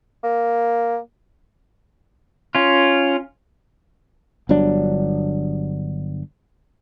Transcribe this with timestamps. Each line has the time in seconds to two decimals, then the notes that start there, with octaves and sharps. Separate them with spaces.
0.23 A#3
2.55 C#4 F4
4.49 G1 G2 F#3 D4